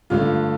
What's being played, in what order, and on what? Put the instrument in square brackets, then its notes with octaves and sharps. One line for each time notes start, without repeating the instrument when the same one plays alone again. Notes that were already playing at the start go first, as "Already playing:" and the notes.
[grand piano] G2 D3 A3 F4